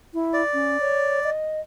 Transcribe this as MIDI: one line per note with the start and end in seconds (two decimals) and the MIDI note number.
0.14 0.42 64
0.33 1.30 74
0.54 0.77 61
0.80 1.20 73
1.24 1.61 75